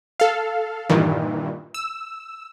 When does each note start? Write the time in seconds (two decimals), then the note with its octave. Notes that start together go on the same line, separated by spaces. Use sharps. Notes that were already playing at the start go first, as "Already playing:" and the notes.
0.20 A4 F5
0.90 G2 A#2 D#3 E3
1.74 E6